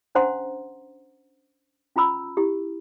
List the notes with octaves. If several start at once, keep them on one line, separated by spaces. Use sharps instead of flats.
C#4 D4 C5 F#5 A#5 C6
C#4 F4 A#5 B5 E6
E4 G4